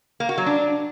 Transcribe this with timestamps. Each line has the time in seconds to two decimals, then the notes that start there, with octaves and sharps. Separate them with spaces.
0.20 A#3
0.29 F#4
0.38 F#3
0.46 D4